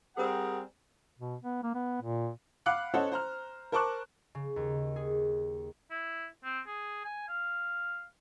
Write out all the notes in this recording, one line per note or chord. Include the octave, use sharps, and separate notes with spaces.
G3 C4 G#4 A#4 F#5
B2
B3
A#3
B3
A#2
F5 F#5 B5 D6 F#6 C#7
C#4 A4 C5 C#5 D#5 F#5
C5 A#5 F6
A#4 C5 A5 C#6 D6 F#6
C#3
D#2
G#4
E4
C4
G#4
G#5
F5